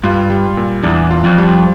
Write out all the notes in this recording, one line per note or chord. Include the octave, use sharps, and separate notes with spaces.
G2 F4
G3
A#2
E2 D4
F4
F2
G3